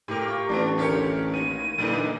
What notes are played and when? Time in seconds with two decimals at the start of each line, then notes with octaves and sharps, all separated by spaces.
0.08 A2 G4 A#4 D6
0.28 F4 C#6
0.49 A1 B3 C4 D4
0.78 D2 G4 A4 A#4 C#5 C#7
1.34 D#2 A#3 C#5 D#7
1.78 A#2 D3 E3 F#3 A3 D#4